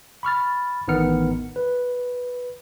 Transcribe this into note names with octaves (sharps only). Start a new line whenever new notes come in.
B5 C#6 F6 A6
A1 D#3 B3 D#4 F6 C#7
B4